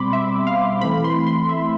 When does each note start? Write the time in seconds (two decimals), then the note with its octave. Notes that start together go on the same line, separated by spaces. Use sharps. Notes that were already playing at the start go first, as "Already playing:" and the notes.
Already playing: B2 G3 C4 B5 C6 D6
0.13 E5
0.47 F5
0.81 E3 A3 C4 B5
1.04 C6
1.27 C6
1.49 E5